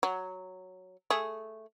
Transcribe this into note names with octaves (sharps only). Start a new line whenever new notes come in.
F#3
A3 G#4